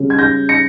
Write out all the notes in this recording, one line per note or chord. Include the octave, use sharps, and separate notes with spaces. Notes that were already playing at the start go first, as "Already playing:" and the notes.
Already playing: C#3 G3 C#4
G#6
G6 A#6
A#6 C#7